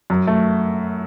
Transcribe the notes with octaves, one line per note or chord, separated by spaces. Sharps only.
F#2
A3